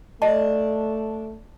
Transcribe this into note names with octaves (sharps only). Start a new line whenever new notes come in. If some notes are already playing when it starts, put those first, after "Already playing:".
A3 D4 D#5 A5